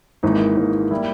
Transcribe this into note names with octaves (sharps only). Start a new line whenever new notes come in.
G#1 G#2 E3 A#3 D#4
G#1 G#2 E3 A#3
G3 A#3 E4